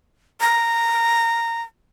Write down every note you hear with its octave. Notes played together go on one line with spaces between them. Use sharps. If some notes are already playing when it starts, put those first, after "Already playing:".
A#5